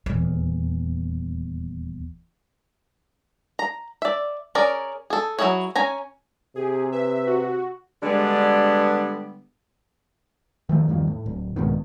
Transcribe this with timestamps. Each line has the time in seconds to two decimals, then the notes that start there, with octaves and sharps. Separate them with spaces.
0.06 D#1 E2
3.59 A#5
4.02 D5 E5
4.55 C#4 G#4 A#4 D5
5.10 G#4 A4
5.39 F#3 B3 E4 G#4 C#5
5.76 C#4 G#5 A#5
6.56 C3 G4 G#4
6.92 B4 E5
7.27 F#4
8.03 D3 G3 G#3 B3 D4
10.69 D#3 F3 A3
10.88 E2 G2 D#3 F3
11.07 A2
11.26 D1
11.56 C2 G#2 B2 D#3